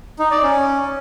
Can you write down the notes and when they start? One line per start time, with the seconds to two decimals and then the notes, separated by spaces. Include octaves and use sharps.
0.19 D#4
0.31 D5
0.43 C#4